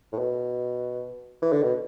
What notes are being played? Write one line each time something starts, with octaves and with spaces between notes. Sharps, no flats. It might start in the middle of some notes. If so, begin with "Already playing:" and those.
A2
B2
E3
D3
B2